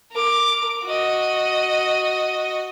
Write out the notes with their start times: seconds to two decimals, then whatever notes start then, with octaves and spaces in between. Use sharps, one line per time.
0.12 A#4 D6
0.86 F#4 D#5